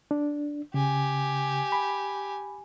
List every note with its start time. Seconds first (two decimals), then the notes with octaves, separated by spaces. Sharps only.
0.11 D4
0.74 C#3 G4 G#5
1.72 B5